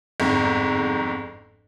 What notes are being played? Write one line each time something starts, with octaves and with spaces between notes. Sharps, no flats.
G1 F2 G#2